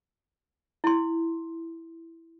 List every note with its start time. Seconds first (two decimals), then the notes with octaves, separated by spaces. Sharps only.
0.84 E4 C6